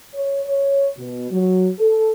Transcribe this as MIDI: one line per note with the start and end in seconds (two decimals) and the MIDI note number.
0.14 0.41 73
0.45 0.90 73
0.97 1.28 47
1.30 1.68 54
1.79 2.11 69